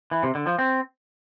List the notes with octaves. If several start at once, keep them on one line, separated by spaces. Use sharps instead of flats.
E3
C3
D3
F3
C4